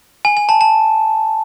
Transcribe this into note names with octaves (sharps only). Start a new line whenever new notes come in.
G#5
G#5
A5
A5